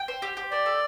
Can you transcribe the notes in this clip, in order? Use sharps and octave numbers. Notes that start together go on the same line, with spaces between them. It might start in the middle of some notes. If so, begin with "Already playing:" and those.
Already playing: G5
C5
G4
G4
C5 D5
A4